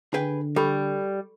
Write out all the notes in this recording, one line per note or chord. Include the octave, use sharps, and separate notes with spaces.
D3 G#4 B4 G5
G3 A4 B5 C#6